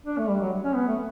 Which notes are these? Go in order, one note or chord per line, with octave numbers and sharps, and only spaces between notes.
D4
A3
G3
F#3
C#4
B3
A3